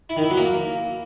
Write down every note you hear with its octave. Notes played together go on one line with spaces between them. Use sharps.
E4
D#3
E4
F#3
A#3